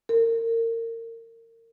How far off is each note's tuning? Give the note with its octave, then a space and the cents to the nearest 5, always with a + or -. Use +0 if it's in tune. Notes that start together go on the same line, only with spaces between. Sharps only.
A#4 -30